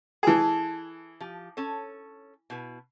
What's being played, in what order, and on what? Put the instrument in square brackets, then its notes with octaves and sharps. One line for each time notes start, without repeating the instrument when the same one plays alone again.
[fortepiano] E3 G#4 [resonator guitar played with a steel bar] A4 A5
[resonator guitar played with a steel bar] F3 G4
C#4 A4 C#5
B2 E4 B4